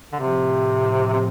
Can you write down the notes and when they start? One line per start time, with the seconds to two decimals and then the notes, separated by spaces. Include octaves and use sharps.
0.13 D3
0.19 A2 C3 F3 C4
1.13 C3